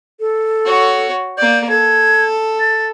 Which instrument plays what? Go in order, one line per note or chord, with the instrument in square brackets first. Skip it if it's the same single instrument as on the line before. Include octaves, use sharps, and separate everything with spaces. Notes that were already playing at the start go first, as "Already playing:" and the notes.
[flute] A4
[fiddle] F#4 C#5
[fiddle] A#3 D5 [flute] G6
[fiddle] A4 [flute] G#6
[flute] A6